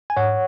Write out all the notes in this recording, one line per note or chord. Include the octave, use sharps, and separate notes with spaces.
G#5
G#2 C#5 F#5